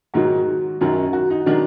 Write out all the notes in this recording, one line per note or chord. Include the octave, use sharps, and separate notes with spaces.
G#2 D#3 F#3 F#4
F#2 D#3 F#3
F#4
D#4
D#3 F#3 D4